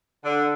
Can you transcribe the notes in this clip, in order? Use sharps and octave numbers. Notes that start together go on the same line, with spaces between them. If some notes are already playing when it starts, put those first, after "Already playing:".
D3